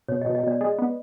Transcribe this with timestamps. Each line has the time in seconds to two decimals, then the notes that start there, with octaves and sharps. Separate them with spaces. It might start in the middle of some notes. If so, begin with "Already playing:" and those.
0.08 B2 C#5
0.21 D#5
0.26 B2
0.35 D#5
0.43 B2 D5
0.61 G#3 D#5
0.78 B3